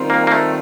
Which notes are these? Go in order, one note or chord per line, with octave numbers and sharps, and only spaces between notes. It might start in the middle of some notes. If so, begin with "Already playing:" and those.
Already playing: D#3 G3 C4 F4
A#3
A#3
A3